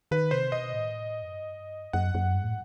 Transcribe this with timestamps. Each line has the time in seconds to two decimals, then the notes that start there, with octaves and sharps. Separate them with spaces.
0.11 D#3 B4
0.31 C3 C5
0.52 B2 D#5
0.73 A2
1.23 F#2
1.33 G2
1.93 F#2 F#5
2.15 F#2
2.35 G2
2.44 A2